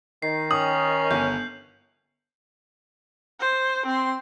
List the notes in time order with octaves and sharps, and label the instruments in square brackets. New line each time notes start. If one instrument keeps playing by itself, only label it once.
[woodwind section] D#3 [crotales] C7
[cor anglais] C#4 [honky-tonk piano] D#6 [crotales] F#7
[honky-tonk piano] G1 [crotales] G6
[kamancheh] C5
C4 C6